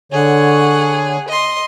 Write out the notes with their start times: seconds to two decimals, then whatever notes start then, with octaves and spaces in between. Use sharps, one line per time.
0.12 D3 G#4 C#5 F#5
1.29 D#5 C6